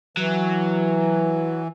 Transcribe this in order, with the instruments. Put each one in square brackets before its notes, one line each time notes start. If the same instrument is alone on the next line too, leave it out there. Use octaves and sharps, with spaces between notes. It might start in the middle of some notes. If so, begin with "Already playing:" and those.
[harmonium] E3 [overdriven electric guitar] F#3